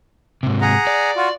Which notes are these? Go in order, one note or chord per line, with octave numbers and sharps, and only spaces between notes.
G#2 C3
G#4 F#5 A#5
D5
F4 F#4